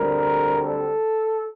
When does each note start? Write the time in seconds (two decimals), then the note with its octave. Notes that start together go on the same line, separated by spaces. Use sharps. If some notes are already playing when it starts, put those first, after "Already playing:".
Already playing: D2 D3 G3 C4 A#4
0.61 A4